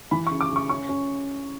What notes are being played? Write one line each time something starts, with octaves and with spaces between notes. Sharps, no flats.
E3 B5
C#6
C#3
D6
C#3
C#6
C#4 C#6
C#4